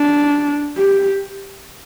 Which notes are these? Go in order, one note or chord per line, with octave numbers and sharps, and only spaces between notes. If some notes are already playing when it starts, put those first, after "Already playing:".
Already playing: D4
G4